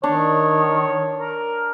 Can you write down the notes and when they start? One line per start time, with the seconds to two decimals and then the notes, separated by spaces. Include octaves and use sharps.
0.04 D#3 D4 C#5
1.17 A#4